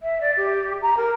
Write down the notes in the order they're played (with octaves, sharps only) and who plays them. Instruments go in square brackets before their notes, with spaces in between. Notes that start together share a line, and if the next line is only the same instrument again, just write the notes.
[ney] E5
D5
G4
A#5
A#4